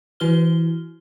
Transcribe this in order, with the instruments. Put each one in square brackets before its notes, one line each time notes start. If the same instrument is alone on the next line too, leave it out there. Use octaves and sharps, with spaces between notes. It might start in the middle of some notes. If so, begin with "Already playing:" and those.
[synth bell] E3 E4 F#4 B4 F6 G7